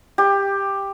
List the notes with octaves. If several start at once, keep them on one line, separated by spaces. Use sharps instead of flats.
G4